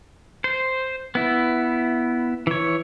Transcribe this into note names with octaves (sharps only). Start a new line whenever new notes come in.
C5
B3 E4
E3 C#5